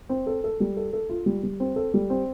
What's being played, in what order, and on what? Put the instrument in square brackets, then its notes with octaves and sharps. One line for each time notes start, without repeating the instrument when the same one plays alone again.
[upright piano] C4
A4
A4
G3
A4
A4
F4
G3
G3
C4
A4
G3
C4